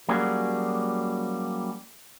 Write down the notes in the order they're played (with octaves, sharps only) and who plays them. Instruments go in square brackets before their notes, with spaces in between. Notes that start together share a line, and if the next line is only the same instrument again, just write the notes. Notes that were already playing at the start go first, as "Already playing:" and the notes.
[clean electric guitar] F#3 G3 A#3 C#4 F#4 G#4